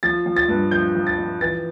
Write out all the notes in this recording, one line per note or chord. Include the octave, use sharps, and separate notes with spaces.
F3 A6
F3
A6
G2
F3 G6
F3
A6
F3
E3 A6